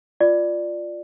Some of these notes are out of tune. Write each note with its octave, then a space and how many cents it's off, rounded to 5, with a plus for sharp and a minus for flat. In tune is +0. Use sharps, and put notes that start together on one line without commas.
F4 +0 D5 +10